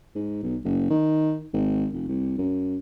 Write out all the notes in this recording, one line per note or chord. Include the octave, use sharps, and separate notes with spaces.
G#2
B1
F#1
D#3
G#1
F1
C2
F#2